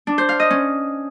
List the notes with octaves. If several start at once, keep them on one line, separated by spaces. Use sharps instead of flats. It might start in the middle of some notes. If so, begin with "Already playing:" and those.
D4
C5
F5
D#5
C#4